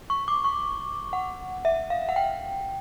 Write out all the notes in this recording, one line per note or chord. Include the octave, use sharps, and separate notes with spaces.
C#6
D6
C#6
F#5
E5
F5
F#5
G5